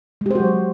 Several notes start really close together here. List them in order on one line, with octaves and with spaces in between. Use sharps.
G#3 G4 C5 F#4 F#3